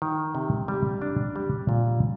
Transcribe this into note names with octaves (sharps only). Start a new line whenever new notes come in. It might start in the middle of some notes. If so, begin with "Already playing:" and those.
D#3
C3
G3
D4
G3
A#2